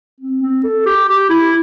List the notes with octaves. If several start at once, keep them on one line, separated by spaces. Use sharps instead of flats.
C4
C4
A4
G4
G4
E4